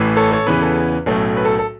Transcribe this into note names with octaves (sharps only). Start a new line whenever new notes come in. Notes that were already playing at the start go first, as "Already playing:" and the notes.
Already playing: A1 A2 E3
A4 C#5
A4 C#5
E2 C#3 E3 B3 B4
A4
B1 A2 F#3 A3 C#4
B4
A4
A4